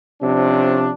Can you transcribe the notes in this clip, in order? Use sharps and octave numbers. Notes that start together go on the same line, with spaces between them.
C3 F3 C#4 D4